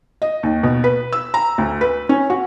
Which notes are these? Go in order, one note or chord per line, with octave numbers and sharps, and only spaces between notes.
D#5
D#2
B2
B4
E6
A#5
D2
B4
C#4
F#4